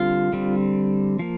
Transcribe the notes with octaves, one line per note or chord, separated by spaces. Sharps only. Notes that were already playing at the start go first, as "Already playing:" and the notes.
Already playing: D3 G3 C4 F4
D3 G3 C4
F3 A#3